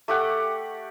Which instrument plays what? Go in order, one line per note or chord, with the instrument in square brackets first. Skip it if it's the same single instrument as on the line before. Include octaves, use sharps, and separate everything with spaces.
[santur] A3 G4 F#5